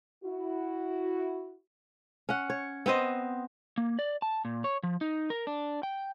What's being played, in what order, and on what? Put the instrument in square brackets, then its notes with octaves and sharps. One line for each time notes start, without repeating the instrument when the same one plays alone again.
[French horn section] E4 F#4
[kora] C#4 F#5
C#5
B3 C4 C5 D#5
[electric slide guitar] A#3
D5
A5
A#2
C#5
F3
D#4
A#4
D4
G5